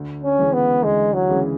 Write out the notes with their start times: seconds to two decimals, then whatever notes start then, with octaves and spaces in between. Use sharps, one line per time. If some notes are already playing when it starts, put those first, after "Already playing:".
Already playing: D2
0.24 C#4
0.39 C#3 E3 G#3
0.53 B3
0.84 D2 G#3
1.13 F#3
1.29 C#3 E3 G#3